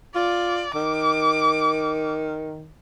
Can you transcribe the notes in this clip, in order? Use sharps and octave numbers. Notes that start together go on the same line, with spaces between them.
F4 D5
D#3 D6